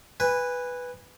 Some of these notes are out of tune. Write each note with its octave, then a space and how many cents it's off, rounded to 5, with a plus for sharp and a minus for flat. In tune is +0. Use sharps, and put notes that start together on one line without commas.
B4 +0 G#5 -25